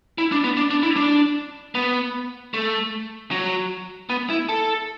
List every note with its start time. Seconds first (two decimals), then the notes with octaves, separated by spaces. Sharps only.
0.18 E4
0.32 D4
0.44 B3
0.57 D4
0.71 D4
0.83 E4
0.97 D4
1.75 B3
2.54 A3
3.31 F#3
4.10 B3
4.30 E4
4.49 A4